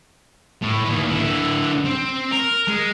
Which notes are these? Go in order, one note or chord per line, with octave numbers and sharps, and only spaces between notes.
A2
D#2 E3
D3 E4
C4
A#4
G#3